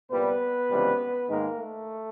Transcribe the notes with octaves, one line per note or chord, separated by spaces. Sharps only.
C2 A#2 G3 B3 B4
C#2 C3 E3 G3
G#2 D#3 G#3 A#3 A#4
A3 A4